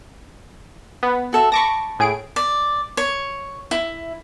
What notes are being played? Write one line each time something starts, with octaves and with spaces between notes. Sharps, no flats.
B3
F#4 A4 E5
A5 B5 C#6 D6 A#6
A2 G#4 D7
D5
C#5
E4